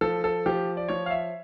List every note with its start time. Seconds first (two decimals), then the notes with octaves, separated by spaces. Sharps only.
0.01 F3 A4
0.24 A4
0.46 F3 G4
0.77 D5
0.89 F3 C#5
1.06 F5
1.11 E5